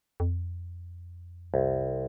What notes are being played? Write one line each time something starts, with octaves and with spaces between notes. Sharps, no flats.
F2
C2